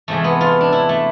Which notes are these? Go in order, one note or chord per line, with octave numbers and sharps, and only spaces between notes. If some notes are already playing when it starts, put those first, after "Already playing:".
E2 C3 F3 G#3 A3
B3
F4
D4
E4
A3